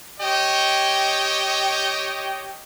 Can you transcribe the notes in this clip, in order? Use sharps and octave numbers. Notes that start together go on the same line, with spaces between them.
G4 C#5 D#5 G5